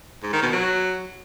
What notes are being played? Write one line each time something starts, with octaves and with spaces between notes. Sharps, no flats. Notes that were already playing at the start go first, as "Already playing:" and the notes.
G#2
D#3
B2
F#3